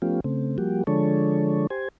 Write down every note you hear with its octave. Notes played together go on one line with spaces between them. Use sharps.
F3 A3 B3 C#4 F4 G4
C#3 A3 C4
F3 G3 A#3 F#4 G4
D3 F3 G#3 D4 A4 C#5
G4 C5 G#5